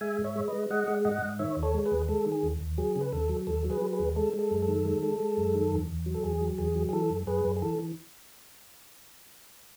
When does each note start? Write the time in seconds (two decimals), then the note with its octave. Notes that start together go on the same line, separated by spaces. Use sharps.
0.01 G#3 E5 G#5
0.18 G#2
0.24 C#5 E5
0.36 G#3
0.48 G#3 B4 D#5
0.70 G#3 D#5 F#5
0.88 G#3
1.05 G#2 D#5 F#5
1.22 G#2
1.39 D#3 C#5 E5
1.57 D#2
1.63 A4 C#5
1.74 G#3
1.85 G#4 B4
1.91 D#2
2.08 G#3 A4
2.26 D#3
2.32 G#4
2.43 D#2
2.60 D#2
2.78 F#3 G#4
2.96 C#3
3.01 B4
3.12 D#2 A4
3.29 F#3
3.47 D#2 A4
3.65 F#3
3.70 G#4 B4
3.82 F#3
3.93 G#4 B4
3.99 D#2
4.16 G#3 A4
4.34 G#3
4.39 A4
4.51 F#2
4.62 A4
4.68 D#3
4.85 G#3
5.03 G#3
5.20 G#3
5.37 F#2
5.55 D#3
5.72 E2
5.89 E2
6.06 F#3
6.14 A4
6.23 E2 G#4
6.41 F#3
6.58 E2 G#4
6.75 F#3
6.89 G#4
6.93 E3 A4
7.10 F#2
7.27 F#2 G#4 B4
7.45 F#2
7.56 G#4
7.62 E3 A4
7.79 E3